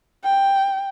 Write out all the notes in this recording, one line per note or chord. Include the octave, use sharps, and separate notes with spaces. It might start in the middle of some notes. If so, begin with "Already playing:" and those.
G5